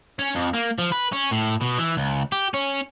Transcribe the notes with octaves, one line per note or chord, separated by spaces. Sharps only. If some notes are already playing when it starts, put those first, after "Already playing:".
C#4
F2
A#3
F3
B4
C#4
A2
B2
E3
C#2
G4
C#4